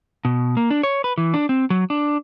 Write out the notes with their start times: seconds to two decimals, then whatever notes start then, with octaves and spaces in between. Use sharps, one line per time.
0.25 B2
0.57 A#3
0.70 D4
0.83 C#5
1.04 B4
1.18 E3
1.34 D4
1.49 C4
1.70 F#3
1.90 D4